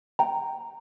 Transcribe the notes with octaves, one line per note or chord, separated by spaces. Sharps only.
G5 A#5